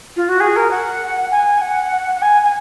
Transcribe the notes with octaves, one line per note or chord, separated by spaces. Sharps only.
F4
F#4
G#4
A#4
F#5
G#5
F#5
F#5
G#5
G#5